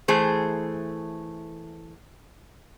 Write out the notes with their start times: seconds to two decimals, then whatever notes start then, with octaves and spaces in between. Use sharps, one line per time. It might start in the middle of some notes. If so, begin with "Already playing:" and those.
0.08 E3 A3 G#4 C5